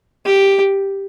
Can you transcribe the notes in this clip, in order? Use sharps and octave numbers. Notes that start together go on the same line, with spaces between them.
G4